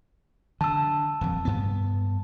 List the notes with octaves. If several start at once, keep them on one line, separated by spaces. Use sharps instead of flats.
D3 A5 E6
D#1 F2
G2 B3